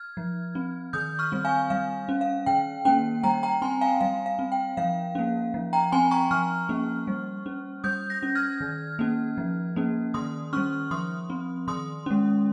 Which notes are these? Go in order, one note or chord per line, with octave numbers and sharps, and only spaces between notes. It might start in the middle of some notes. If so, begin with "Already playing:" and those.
Already playing: F6 G#6
F3
C4
D#3 D#6 G6
C#6 F6
G3 C4
F5 G#5
G3 F5
C#4
F5
D#3 G5
A#3 C#4 G5
G3 G5 A#5
G5 A#5
C4 G#5 C6
F5 G#5
G3 F5
F5
C4
G5
F3 F5
A#3 C#4
F3
G5 A#5
C4 G#5 C6
A#5 C#6
F3 C#6 F6
A#3 C#4
G3
C#4
G3 D#6 G6
G6 A#6
C#4
F6 G#6
D#3
A#3 C#4
F3
A#3 C#4
D#3 C6 D#6
G3 C#4 C#6 F6
F3 C6 D#6
C4
D#3 C6 D#6
G#3 C#4